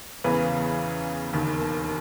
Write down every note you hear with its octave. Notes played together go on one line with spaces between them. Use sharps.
E2 C#3 E3 B4
E1 D#2 D#3